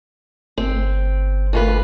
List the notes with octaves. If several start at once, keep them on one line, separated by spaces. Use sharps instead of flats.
G1 C4
D2 F4 B4